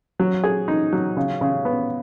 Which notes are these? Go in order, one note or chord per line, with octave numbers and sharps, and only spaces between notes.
F#3
G#4
D#4
F#3
C#3
C#3
B3